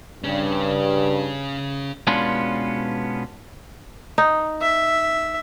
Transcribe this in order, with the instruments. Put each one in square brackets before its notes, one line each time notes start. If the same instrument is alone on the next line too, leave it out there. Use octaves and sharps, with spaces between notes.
[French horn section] G2 [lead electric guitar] C#3 C#4
[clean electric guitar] B2 G#3 B3 C#4 D4 F4
[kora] D#4
[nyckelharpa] E5